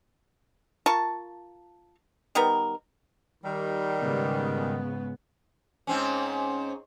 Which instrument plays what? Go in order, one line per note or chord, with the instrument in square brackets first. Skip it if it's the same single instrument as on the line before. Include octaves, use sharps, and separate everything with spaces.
[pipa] F4 A#4 A5 C#6
D#3 G3 B3 A#4
[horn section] D#3 G3
[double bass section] G#2 C#3 B3
[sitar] G#2 C4 C#4